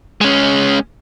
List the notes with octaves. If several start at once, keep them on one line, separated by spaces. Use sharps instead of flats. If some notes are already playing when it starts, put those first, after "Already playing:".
G#3 C#4